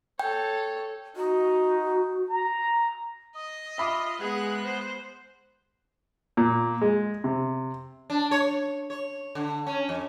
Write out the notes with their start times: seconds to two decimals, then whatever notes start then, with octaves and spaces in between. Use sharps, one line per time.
0.19 A4 C#5 G5
1.17 D#4 F#4
2.30 A#5
3.35 D#5 D#6
3.78 F4 E5 B5 D6
4.19 G#3 B3 G#4 F#6
4.64 C5
6.37 A#2
6.81 G#3
7.24 C3
8.10 D4
8.31 C#5
8.90 C#5
9.35 D3
9.67 C#4
9.89 F2